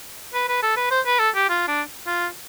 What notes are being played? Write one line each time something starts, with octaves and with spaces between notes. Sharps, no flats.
B4
B4
A4
B4
C5
B4
A4
G4
F4
D4
F4